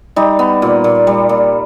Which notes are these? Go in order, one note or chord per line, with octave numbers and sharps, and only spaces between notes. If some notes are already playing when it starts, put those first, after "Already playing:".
G3 D#4
B3
A#2
A#2
G3
A#2